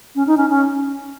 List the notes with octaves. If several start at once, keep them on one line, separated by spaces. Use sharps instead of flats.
C#4
D#4
C#4
C#4